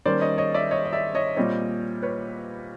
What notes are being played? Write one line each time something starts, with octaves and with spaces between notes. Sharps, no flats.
D#3 G3 A#3 C#4 C5 D5
C#5 D#5
C#5 D#5
D5 E5
C#5 D#5
D#5
D5 E5
C#5 D#5
A#2 G3 C4 C#5 D#5
B4 C#5